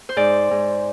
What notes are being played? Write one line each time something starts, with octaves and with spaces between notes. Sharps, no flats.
C5
G#2 D5
G#2